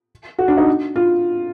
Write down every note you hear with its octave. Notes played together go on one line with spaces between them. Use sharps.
F#4
D4
D#4
F4